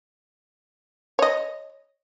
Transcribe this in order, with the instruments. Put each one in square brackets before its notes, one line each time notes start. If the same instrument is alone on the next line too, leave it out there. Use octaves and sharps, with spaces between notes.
[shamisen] C#5 D#5